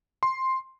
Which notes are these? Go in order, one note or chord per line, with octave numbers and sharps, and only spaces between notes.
C6